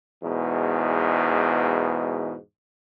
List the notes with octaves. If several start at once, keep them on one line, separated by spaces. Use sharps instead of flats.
E2 G#2 B2